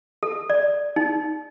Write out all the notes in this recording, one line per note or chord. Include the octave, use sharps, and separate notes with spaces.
A4
D5
D#4